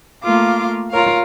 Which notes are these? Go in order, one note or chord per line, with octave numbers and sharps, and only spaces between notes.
A3 A#3 F4 F5 D6
F4 A#4 C#5 F5